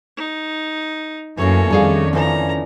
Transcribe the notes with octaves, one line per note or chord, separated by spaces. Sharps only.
D#4
F#2 E3 A3 A#3 C#4 A4 C#5
F2 D#3 G3 D4 G#4 F5
C#3 E3 F3 C#4 A4 A#5